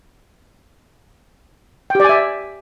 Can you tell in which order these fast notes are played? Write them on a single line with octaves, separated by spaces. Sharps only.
G5 G4 D5 G#5 E5